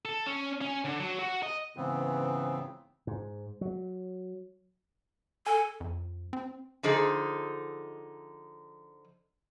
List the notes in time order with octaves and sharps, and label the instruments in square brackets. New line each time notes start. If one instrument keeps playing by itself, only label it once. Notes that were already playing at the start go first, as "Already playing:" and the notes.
[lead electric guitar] A4
C#4
C#4
D3
F#3
F#4
D#5
[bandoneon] G#2 C#3 E3 B3 C4
[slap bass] G#2
F#3
[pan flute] A4 [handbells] G#5
[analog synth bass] F2
C4
[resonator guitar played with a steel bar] D3 F3 D#4 G#4